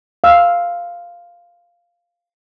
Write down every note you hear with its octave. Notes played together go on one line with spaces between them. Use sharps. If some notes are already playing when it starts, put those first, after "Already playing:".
F5 E6